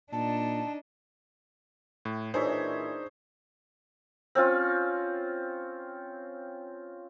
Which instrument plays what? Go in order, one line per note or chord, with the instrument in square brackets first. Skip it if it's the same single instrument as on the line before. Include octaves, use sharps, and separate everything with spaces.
[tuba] A#2 [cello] D4 D#4 [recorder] A5
[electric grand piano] A2
[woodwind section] A#2 E3 [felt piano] D4 D#4 [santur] G#4 C#5 E5 [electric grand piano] C5
[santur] C4 C#4 F4